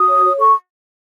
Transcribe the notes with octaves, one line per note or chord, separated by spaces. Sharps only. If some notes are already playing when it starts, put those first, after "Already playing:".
Already playing: F#4 D#6
C#5
C#5
A4 C#6